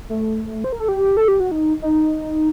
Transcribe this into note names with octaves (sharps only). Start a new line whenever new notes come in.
A3
C5
A#4
A4
G4
A4
G4
F#4
D#4
D#4